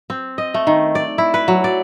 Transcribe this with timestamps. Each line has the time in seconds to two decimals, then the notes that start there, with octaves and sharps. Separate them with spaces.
0.10 C4
0.38 D#5
0.54 A3
0.67 D#3
0.95 D5
1.18 E4
1.34 B4
1.48 F#3
1.64 D5